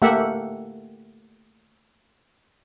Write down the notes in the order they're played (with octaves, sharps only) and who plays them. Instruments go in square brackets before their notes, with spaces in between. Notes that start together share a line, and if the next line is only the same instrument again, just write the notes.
[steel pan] A3 A#3 G4 E5 F#5